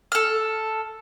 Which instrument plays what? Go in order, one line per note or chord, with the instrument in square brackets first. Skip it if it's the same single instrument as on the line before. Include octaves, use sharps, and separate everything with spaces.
[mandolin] A4 F6